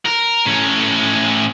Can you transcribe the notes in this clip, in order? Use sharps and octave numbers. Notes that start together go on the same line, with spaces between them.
A#4
A2 C#4